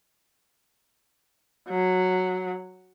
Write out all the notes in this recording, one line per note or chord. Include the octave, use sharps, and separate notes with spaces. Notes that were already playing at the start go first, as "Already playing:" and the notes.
F#3